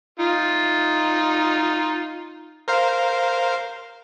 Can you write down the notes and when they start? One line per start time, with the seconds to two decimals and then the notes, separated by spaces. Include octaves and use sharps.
0.20 D#4 F4
2.68 A#4 C5 F5